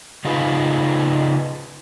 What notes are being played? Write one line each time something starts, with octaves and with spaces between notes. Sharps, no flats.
C#3 D#4 F4 G#4 B4